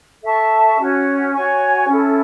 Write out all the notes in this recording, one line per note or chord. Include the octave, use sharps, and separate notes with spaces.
A4 E5 A5 C#6
C#4 F#4 C#5
F#4 C#5 G#5 C#6
C#4 E4 A4